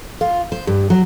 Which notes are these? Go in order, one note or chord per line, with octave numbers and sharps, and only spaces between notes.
F4
C5
G2
F#3